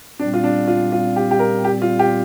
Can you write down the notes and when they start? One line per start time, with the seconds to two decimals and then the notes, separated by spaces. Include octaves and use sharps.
0.19 A#2 G3 C4 D4
0.34 F4
0.44 D4
0.67 F4
0.92 F4
1.16 G4
1.31 G4
1.39 A#4
1.64 G4
1.82 F4
1.99 G4